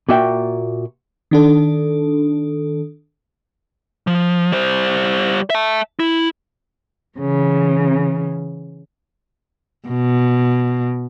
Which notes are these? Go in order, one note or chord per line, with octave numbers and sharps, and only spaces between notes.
A#2 A#3 F#4 E5 G5
D#3 D4 A4
F3
G3 C5
E5 A5
E4
C#3 E3
B2